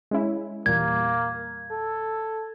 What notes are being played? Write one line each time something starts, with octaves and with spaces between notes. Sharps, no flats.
G#3 C#4 E4
E2 A#2 G3 A#3 G#6
A4